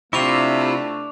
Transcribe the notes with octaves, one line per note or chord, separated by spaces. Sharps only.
C3 A3 D4 E4 F4 C#6 D6 F7